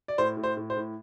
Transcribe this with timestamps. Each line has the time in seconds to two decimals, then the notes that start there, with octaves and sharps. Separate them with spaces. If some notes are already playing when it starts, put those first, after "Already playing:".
0.08 D5
0.18 A2 C5
0.37 A2
0.43 C5
0.57 A2
0.70 C5
0.77 A2